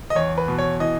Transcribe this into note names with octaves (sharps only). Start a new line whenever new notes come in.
D#5
E2 C#5
B4
B2
C#5
E3 D#5